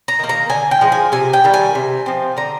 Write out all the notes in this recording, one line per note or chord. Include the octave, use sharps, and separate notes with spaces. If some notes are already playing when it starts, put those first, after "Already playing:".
A#5
D#3 A#3
A#5
D3 G#5
G5
F3 G#3
G#5
C3 G#5
G5
D#3 G3
G#5
C3
F3 C4
D3 A#5